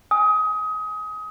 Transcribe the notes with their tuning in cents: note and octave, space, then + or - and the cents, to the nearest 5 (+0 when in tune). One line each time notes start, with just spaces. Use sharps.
G#5 +0 D#6 +25